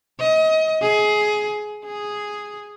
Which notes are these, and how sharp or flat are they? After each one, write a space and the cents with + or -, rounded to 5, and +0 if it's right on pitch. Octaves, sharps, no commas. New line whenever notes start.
D#5 +30
G#4 +20
G#4 +0